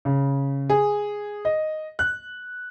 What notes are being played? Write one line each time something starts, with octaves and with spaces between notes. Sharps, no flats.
C#3
G#4
D#5
F#6